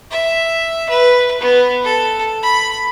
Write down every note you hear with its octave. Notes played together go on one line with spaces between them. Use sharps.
E5
B4
B3
A4
B5